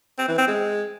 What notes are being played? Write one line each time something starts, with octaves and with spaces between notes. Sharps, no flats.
C4
E3
C4
G#3